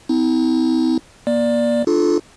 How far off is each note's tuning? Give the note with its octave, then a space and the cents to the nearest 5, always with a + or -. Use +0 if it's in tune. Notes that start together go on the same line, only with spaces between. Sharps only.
C4 -45 E4 -45
A#3 +35 D5 +5
D4 +30 F4 +0 A4 -20